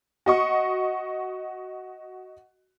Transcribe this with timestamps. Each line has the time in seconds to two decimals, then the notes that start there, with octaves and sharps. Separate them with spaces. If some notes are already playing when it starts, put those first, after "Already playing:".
0.26 F#4 D#5 C#6